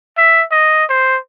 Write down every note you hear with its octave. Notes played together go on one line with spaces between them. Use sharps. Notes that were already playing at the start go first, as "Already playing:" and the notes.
E5
D#5
C5